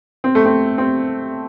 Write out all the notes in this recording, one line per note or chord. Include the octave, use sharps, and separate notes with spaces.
C4
A3
C4
C4